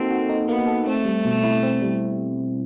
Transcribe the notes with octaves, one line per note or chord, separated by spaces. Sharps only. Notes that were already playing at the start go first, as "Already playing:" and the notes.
Already playing: A#3 C4 D#4 F#4 A4
F#4
D#4
A#3 B3
A4
A3 C4
G3
B2
E4
C4
G3